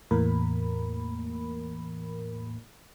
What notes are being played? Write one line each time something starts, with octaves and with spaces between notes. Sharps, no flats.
E2 A2 E3 A#3 A#4 B5